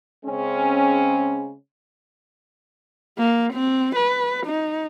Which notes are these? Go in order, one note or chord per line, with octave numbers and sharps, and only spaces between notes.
C#3 G#3 C4 C#4
A#3
C4
B4
D#4